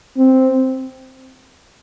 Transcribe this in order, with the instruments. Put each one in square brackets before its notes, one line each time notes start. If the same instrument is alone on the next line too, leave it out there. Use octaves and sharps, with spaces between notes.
[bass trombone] C4